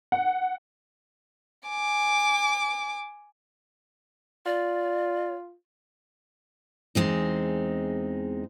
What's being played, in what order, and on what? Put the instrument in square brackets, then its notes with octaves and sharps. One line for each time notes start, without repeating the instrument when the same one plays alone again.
[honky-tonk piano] F#5
[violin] G#5 D6
[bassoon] F4 [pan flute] D5
[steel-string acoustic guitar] E2 G#3 C4 D#4